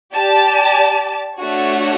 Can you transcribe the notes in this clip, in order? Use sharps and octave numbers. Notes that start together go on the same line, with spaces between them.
G4 D5 A5
A3 D4 F#4 C#5